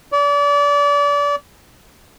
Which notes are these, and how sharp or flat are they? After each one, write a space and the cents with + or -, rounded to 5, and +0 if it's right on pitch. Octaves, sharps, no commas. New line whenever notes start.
D5 -35